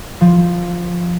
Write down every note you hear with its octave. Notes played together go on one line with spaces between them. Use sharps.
F3